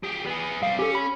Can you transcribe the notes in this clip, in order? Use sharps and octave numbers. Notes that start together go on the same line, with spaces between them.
G4 G#4
B3 G#4
G3 C4 F5
C#4 G4 A4
B5